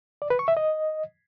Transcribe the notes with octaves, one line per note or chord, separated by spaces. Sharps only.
D5
B4
C#6
E5
D#5